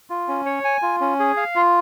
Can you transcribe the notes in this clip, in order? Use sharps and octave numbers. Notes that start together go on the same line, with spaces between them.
F4
C#4
C#5
G#5
F4
C#4
G#4
F5
F4